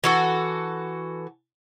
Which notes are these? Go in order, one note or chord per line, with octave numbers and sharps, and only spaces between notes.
E3 F#4 A4